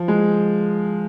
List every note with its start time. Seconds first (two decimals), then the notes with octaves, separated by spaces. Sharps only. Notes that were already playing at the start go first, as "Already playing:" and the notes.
Already playing: F3
0.08 G#3